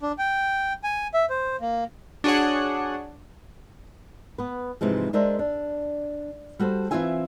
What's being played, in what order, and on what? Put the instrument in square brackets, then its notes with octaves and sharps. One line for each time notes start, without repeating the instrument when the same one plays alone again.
[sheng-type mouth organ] D4
G5
G#5
E5
C5
A#3
[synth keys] D4 F#4 G#4 C#5 F#5
[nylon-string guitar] B3 B4
G#2 C3 E3 F3 G#3
G#3 D4 A#4 C5 D#5 E5
D4
G3 F#4 A4 C5
E3 C4 E4 F4 E5 G#5